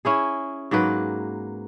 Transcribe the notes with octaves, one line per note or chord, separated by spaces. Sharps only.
C#4 E4 G#4
G#2 F#3 A#3 B4